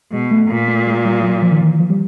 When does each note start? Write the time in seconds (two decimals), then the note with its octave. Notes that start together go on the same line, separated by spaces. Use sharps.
0.12 B2 G#3
0.31 A3
0.49 A#2 A#3
0.68 A3
0.87 G#3
1.05 G3
1.23 F#3
1.42 F3
1.51 D#3
1.61 E3
1.79 F3
1.90 G3